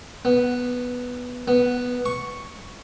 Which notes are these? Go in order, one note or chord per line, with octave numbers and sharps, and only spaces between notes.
B3
B3
C#6